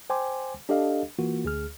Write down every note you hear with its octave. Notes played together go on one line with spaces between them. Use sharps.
C5 G5 G#5 C6 D6
D4 G4 A4 D#5 F5
E3 A#3 F4 F#4
D2 G#4 F6